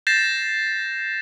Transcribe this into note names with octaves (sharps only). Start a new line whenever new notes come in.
G6 A6 A#6 C7 E7